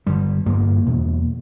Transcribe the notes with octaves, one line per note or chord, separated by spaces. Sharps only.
G2 D3 G3
G2 D3 A#3
E2 B2